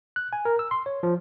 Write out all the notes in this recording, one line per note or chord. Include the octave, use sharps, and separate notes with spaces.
F#6
G#5
A#4
E6
C6
C#5
F3